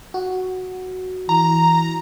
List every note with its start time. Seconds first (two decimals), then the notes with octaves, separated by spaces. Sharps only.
0.14 F#4
1.29 E3 A#5